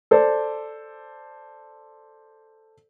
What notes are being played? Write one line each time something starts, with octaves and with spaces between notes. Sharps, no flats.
A4 C5 D5